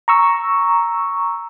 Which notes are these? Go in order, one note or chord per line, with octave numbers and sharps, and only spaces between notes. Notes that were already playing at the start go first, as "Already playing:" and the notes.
A#5 C#6 E6